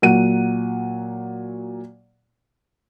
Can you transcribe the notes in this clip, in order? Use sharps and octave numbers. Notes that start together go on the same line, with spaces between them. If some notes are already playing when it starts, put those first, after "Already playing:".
A#2 F#3 F#5 D#7